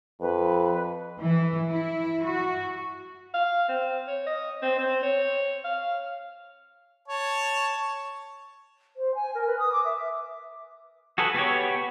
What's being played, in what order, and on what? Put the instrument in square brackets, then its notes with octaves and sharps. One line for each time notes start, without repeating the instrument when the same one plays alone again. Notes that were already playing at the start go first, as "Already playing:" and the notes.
[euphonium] F2 [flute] B4
[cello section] E3
E4
F#4
[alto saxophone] F5
C4
C#5
D#5
C4
C4
C#5
F5
[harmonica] C#5 A5
[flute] C5
G#5
A#4
B4
D#6
D6
E5
[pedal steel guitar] F#4 G#4 A4 B4
B3 F#4 G4 C#5